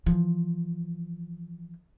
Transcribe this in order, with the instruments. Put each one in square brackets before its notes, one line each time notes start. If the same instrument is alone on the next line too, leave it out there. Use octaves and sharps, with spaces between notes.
[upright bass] E3 F3